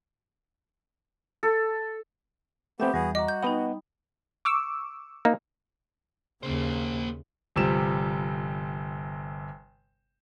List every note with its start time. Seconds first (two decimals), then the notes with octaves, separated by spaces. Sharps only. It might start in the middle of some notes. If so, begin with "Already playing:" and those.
1.43 A4
2.80 A3 B3 C4 G4 E5 G6
2.94 E2 G3 B3 F#4 G#4
3.15 F#4 D#5 A#5 D6
3.28 G6
3.43 B3 D#4 D#5 F#5 G5 B5
4.45 C#6 D6 E6
5.25 A#3 D#4
6.43 D#2 C#3 A#3 C5
7.56 G1 C3 F3 G3 E7